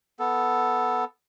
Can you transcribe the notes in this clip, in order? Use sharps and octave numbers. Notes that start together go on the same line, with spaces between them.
B3 A4